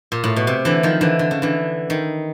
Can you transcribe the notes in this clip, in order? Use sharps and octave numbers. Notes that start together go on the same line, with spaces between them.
A#2
A2
B2
C3
D3 E3
D#3 F3
D3 E3
D3
C#3
D3 E3
D#3